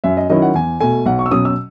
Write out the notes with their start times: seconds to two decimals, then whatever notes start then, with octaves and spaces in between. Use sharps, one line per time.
0.04 F#2 E5
0.17 D#5
0.30 D#3 F#3 C#4 E4 D#5
0.42 F#5
0.54 E2 G#5
0.81 B2 A3 G#5
1.06 B1 F#5
1.19 C#6
1.26 E6
1.31 B2 F#3 C#4 D#6
1.45 E6